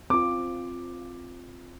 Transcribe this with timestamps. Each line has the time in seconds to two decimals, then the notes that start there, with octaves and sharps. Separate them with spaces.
0.10 C4 F4 D6